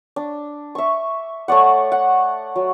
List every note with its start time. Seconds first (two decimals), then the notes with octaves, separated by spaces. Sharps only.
0.16 D4
0.75 E5 C#6
1.48 A3 C#5 D5 F#5
1.92 F#5
2.56 F#3